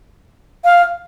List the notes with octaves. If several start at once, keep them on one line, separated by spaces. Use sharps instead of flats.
F5